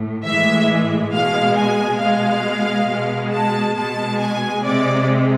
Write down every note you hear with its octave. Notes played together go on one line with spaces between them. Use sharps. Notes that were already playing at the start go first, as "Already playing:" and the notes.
Already playing: A2
A2 E3 G#3 E5
B2 G#3 F5
G#5
B2 G#3 F5
B2 G#3
A5
B2 G#3 A5
G#5
C3 G#3 D5